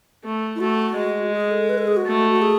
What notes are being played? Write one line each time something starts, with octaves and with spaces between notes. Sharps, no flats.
A3
E4
A3 F#4
G#3
G#4
A4
B4
A4
G#4
F#4
A3
F#4
G#4